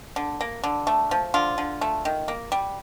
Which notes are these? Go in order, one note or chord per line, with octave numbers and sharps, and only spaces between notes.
D3
A#3
D3
A3
F3
D3 F4
D3
A3
D#3
A#3
G3